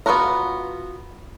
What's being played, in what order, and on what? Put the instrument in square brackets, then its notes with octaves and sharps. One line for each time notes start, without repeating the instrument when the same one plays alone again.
[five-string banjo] B3 F4 F#4 A#4 A#5